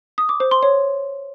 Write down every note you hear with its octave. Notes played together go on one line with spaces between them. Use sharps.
D#6
D6
C5
C6
C#5